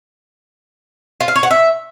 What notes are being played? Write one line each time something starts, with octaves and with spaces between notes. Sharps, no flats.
F4
F5
C#5
F#5
E5